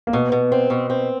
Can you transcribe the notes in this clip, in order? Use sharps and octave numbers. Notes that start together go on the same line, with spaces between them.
A#3
B2 B3
B2
C4
B2
C4